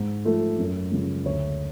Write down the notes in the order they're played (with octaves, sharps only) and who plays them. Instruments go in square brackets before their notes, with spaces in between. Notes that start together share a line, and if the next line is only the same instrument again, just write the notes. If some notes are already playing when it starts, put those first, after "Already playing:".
Already playing: [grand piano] G#2
F3 A3
F#2
C#3 F3 G#3
D2 C#5